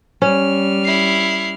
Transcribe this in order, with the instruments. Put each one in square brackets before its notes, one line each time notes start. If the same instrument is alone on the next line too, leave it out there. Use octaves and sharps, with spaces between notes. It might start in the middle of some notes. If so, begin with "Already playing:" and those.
[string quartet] G3 F6 [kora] C#4
[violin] E4 C7